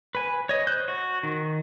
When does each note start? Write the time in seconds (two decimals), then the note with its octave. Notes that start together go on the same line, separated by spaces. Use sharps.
0.15 B4 G#5
0.49 C#5 D#5
0.67 C5 F#6 G6
0.88 F#4
1.23 D#3